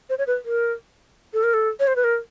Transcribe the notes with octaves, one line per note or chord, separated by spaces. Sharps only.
C5
C#5
B4
A#4
A4
A#4
A4
C#5
C5
B4
A#4